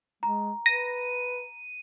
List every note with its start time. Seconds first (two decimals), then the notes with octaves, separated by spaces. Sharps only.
0.23 G#3 A#5
0.66 B4 A#6 D#7